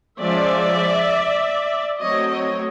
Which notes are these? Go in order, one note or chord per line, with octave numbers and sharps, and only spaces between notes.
F3 G#3 C#4 D5 E5
F#3 A3 C4 C#5 D#5
C#5 D#5